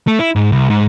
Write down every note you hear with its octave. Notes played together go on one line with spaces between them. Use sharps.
A3
E4
G#2
C2
G#2